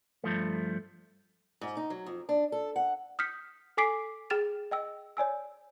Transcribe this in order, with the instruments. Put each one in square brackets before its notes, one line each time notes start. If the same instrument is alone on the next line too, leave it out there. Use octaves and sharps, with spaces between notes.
[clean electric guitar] G2 F3 A3
[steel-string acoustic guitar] G#2
D#4
F#3
F2
D4
A4
F#5
[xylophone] D#6 F6 G6 B6 C#7
A4 G#5 D6 B6 C7 D7
G#4 G5 F6 A6 E7 F7
D#5 G5 E6
C#5 D5 G#5 E6